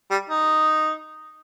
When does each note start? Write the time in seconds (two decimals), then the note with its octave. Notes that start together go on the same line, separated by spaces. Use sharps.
0.11 G3
0.30 D#4